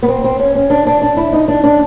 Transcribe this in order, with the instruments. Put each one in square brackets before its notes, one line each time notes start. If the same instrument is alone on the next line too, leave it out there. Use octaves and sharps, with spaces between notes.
[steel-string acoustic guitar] B3
C4
C4
C#4
C#4
D4
D4
D4
E4
D#4
D4
D4